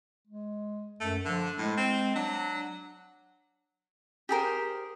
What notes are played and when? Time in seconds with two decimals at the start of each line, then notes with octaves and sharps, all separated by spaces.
0.27 G#3
1.00 F#2 A3
1.25 D3 F3
1.58 A2 G#3
1.77 C4
2.15 F#3 D4
4.29 G4 G#4 A#4 C5